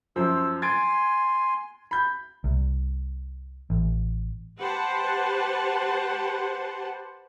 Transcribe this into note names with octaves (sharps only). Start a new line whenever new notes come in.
F#2 F3 C5 E6
G#5 C6 G#6 A6 D7
B5 G6
C2
A1
G4 B4 C5 F#5 A5